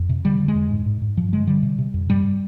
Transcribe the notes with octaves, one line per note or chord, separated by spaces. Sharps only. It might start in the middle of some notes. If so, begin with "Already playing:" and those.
Already playing: F2
C3
D3 G3
D3
G#3
F2
G#2
G#2
G#2
G2 F3
D3 G#3
D3 G3
C3
C3
F2
G2 G3